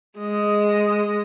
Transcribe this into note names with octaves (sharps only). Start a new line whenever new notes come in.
G#3 D#5